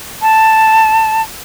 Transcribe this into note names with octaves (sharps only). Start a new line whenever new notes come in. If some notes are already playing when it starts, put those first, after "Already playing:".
A5